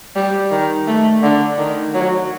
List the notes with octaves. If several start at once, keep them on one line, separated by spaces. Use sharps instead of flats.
G3
D#3
A3
D3
D#3
F#3